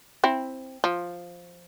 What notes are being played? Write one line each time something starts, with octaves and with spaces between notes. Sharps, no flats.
C4 E4
F3